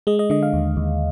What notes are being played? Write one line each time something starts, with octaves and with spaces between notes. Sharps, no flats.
G#3 D#5
D#5
D3 D#5
F5
D#2
D#2